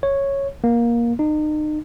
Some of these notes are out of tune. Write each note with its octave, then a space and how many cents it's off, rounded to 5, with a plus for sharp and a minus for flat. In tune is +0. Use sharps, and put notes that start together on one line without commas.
C#5 -5
A#3 +15
D#4 -35